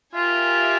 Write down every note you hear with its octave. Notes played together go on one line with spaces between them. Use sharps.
F4 G4 A#4 E5 G#5